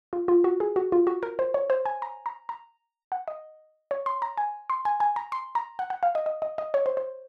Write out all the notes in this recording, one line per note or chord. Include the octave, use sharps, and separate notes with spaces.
F4
F4
F#4
G#4
F#4
F4
F#4
A#4
C5
C#5
C5
G#5
A#5
A#5
A#5
F#5
D#5
C#5
C6
A#5
G#5
C6
G#5
G#5
A#5
C6
A#5
F#5
F#5
F5
D#5
D#5
D#5
D#5
C#5
C5
C5